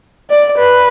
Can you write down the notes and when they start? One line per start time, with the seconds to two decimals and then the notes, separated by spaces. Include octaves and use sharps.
0.30 D5
0.58 B4